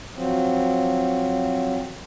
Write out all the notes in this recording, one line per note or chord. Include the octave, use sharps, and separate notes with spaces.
F3 F#3 C4